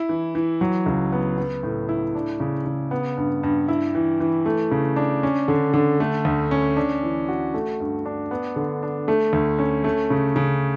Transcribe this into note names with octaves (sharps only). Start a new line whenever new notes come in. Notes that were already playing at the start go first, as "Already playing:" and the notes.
Already playing: E4
E3
E3
F#3
C#2
B3
B3
A2
E4
D4
C#3
C#3
B3
G2
G2
E4
E3
E3
A3
C#3
D4
C#4
D3
D3
A3
D2
C#4
D4
E3
F#4
A3
G2
D4
B3
D3
D4
A3
D2
C#4
A3
C#3
C#3